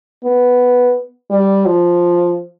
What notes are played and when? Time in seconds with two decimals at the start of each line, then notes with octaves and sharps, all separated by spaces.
0.24 B3
1.31 G3
1.66 F3